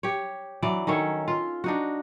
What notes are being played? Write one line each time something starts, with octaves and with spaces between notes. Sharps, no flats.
G4 C#5
E3 F#3 D5
D#3 C#4 A4 C#5
F4
D4 D#4 F#4